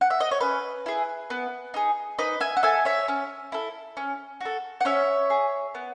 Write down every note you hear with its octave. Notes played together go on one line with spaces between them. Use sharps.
F#5
E5
D#5
C#5
C#4 B4
E4 G#4
B3
D#4 G#4
D#4 B4 D#5
E5 G#5
F#5
A4 E5 G#5
C#5 E5
C#4
E4 A4
C#4
F#4 A4
F#5
C#4 C#5 E5
G#4
B3